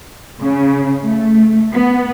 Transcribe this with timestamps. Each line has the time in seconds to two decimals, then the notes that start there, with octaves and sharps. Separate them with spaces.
0.41 C#3
1.03 A3
1.73 B3